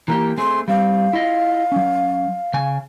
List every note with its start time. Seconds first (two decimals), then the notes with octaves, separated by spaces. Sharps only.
0.08 E3 A#3 G4 A#5
0.38 A3 C4 G#4 C6
0.68 G3 C4 F5
1.13 E4 F4 D#5
1.72 F#3 C#4
2.54 C#3 G#5